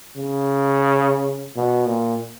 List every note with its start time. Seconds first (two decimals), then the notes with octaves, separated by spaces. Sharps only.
0.16 C#3
1.56 B2
1.86 A#2